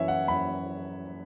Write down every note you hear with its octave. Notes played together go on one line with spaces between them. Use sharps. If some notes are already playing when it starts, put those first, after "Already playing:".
Already playing: F#2 E3 C#5 E5
F#5
F#2 B5